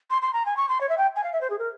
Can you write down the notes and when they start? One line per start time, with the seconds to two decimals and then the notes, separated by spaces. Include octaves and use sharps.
0.10 C6
0.21 C6
0.33 A#5
0.45 G#5
0.56 C#6
0.68 C6
0.80 C#5
0.89 E5
0.97 G5
1.15 G#5
1.23 F5
1.32 E5
1.41 C5
1.50 G#4
1.58 A#4